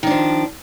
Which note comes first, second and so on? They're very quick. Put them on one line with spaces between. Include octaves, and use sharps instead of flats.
D#3 D4 F3